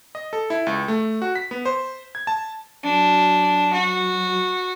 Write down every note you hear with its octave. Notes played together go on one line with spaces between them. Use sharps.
D#5
A4
E4
C#2
A3
F#4
B6
B3
C5
G#6
A5
F#3 D4
F#4